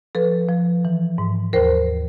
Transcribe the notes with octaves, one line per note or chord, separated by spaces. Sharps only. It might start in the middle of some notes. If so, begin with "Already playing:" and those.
F3 A4 B4
F3
E3
G#2
D#2 A#4 C5